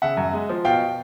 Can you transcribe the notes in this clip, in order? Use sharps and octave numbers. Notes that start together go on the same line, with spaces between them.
C#3 E5 F#5
F#2
G#3
F3
B2 F5 G5